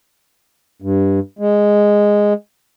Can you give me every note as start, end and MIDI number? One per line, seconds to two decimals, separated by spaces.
0.82 1.19 43
1.39 2.33 56